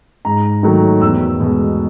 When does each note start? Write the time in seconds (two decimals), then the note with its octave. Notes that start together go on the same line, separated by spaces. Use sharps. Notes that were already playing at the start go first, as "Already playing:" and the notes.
0.25 G#2 A#5
0.63 D#3 F#3 A3
1.01 E2 E6
1.40 B2 G#3